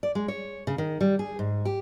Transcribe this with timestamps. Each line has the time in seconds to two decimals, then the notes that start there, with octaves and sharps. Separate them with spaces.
0.03 D5
0.15 G#3
0.28 C#5
0.67 C#3
0.78 D#3
1.01 G3
1.19 G#4
1.39 G#2
1.65 G4